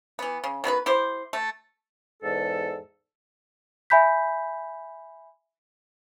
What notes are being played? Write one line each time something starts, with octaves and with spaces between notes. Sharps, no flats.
E3 B3
C#3
B2 D#3 E4 B4
E4 G4 C5
A3
E2 G#2 A4
E5 G#5 B5 G6 B6